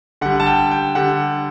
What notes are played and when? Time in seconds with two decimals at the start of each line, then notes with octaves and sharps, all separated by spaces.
0.21 D3 G3 F#5
0.40 A5
0.47 G5
0.71 G5
0.95 D3 G3 F#5